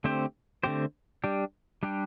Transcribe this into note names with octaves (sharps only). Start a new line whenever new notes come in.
D3 A3 C4 G4 C5
D3 A3 C4 G4 C5
G3 D4 G4
G3 D4 G4